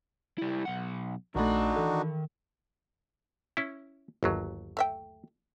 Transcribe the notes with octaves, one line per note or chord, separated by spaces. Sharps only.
G3 E4
B1 F#5
A#1 D#3 A3 D4 D#4 F#4 B5
E3 A4
C#4 E4
G1 D#2 F#3
A3 E5 G5